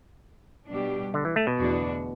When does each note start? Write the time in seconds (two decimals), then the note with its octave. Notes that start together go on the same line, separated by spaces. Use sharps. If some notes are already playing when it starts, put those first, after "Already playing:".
0.70 B2 G3 D4 G4
1.14 D3
1.25 E3
1.36 A3
1.47 B2
1.58 E2 D3 A3 D4 F#4